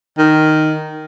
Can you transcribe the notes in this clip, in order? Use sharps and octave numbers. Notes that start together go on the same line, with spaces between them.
D#3